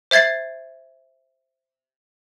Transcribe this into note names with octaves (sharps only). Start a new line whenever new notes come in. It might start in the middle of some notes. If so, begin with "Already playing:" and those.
C5 E5 G#6 A6 C7